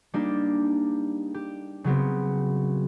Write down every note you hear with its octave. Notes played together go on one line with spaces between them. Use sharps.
G3 A#3 D4 D#4 G4
G4
C#3 F#3 B3 C4